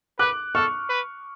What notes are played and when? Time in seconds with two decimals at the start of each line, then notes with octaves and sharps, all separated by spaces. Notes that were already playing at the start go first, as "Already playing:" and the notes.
0.19 B4 D6 F#6
0.55 A4 C#6 F6
0.90 B4